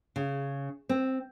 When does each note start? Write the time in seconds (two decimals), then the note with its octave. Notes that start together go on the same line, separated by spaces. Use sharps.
0.16 C#3
0.89 C4